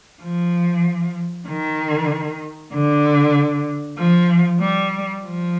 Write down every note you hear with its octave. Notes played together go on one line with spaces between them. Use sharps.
F3
D#3
D3
F3
G3
F3